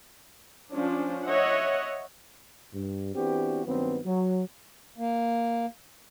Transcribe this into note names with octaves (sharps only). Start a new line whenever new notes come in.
F3 C#4 D4
C#5 D#5 E5 F#5
G2
E3 B3 C4 D4 F#4 G4
G2 D#3 F#3 B3 C4
F#3
A#3